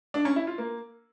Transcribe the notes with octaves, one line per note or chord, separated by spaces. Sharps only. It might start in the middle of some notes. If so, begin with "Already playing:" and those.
D4
C#4
E4
F4
A#3